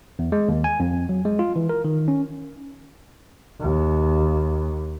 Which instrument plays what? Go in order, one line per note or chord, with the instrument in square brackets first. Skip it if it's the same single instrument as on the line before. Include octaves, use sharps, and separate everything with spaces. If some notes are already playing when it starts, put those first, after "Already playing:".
[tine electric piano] E2
G#3
D#2
G#5
F2
F#3
G#3
F4
E3
A#4
D#3
C#4
[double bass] D#2